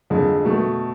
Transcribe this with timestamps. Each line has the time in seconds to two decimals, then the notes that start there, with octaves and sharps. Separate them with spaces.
0.10 F2 D3 G#3
0.45 B2 A3